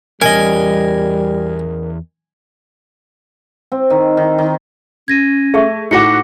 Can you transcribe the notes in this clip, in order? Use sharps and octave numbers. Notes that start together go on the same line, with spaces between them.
E2 G3 C#4 A#4 D#5 G#5
C4
D#3
D#3
D#3
C#4 G#6 A#6 D#7
A3 G#4 E5 C#6
A2 D#4 F#4 F#5 D6 A#6 C#7